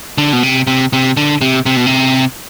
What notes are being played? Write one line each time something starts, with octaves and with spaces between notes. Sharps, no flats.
D3
B2
C3
C3
C3
D3
C3
C3
B2
C3